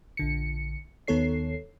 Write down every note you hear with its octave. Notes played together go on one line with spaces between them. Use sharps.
A#1 D3 C#7
D#2 D#3 B3 A4 C#5 C7